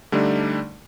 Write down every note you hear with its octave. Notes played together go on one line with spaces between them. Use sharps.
D3 G3 A3 D4 D#4 D5